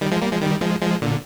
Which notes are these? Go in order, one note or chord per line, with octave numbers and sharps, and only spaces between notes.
D#3 G3
F3 G#3
G3 A#3
F3 G#3
D#3 G3
F3 G#3
F3 G#3
A#2 D3